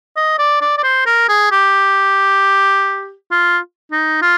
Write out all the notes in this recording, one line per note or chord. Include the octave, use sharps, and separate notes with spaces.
D#5
D5
D5
D5
C5
A#4
G#4
G4
F4
D#4
F4